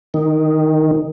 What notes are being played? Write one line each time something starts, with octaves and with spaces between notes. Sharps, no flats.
D#3